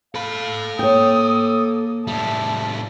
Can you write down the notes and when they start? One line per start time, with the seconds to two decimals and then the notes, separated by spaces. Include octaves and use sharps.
0.15 A4 F5 B5
0.79 A#3 C#5 G5 D#6
2.07 A2 G3 E5 A5